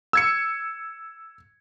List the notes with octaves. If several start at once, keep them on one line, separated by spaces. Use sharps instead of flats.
E6 G#6 C#7